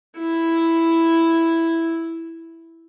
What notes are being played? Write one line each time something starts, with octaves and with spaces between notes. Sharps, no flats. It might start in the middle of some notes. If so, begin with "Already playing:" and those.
E4